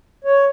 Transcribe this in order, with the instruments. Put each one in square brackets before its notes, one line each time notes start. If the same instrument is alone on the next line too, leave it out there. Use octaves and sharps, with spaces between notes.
[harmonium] C#5